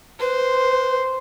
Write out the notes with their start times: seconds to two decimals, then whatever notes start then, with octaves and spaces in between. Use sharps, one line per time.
0.20 B4 C5